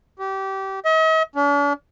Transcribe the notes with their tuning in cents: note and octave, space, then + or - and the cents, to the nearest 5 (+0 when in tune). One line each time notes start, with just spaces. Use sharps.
G4 -25
D#5 +45
D4 -45